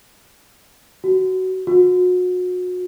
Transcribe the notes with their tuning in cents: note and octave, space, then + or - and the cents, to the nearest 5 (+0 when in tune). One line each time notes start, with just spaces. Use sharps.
F#4 +15
F#4 -35